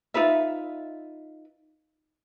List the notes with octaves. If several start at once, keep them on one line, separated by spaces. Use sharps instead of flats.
D#4 F4 B4 E5